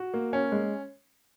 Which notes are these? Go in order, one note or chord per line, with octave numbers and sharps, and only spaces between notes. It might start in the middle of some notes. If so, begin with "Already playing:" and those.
Already playing: F#4
A#3
C#4
G#3